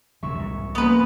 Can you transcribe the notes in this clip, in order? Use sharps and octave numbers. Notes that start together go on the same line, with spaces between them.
E1 C#3 E5 C#6
C2 G#2
F3 A#3 B3 C#4 B4